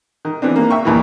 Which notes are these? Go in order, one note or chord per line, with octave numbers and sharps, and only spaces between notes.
D#3
E3 B3 C4 D4
A#3
E5 G5 C#6
D#2 A#2 D#3 E3